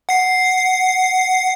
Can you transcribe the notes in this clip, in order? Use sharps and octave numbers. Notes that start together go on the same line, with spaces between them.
F#5 C7